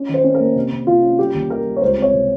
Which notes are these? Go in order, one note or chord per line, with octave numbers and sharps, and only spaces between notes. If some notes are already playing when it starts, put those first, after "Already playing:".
Already playing: C#4
D#3
C5
C#4
A#4
A#3
C3
C3
C3 F4
C#4
G3 G4
D#2
D#3 A#4
G3
C#5
C#2 C5
C4
C#5
C3